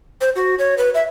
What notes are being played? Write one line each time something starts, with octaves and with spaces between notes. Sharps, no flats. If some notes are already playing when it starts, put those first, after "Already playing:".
C5
F#4
C#5
B4
E5